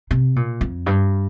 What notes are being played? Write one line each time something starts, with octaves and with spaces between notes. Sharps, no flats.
C3
A#2
F2
G2